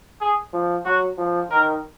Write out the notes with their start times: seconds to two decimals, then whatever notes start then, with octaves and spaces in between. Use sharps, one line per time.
0.21 G#4
0.53 F3
0.85 F#3 F#4
1.17 F3
1.50 D#3 A#4